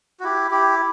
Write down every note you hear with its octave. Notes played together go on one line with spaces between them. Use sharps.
F#4
E4 G4
E4 G4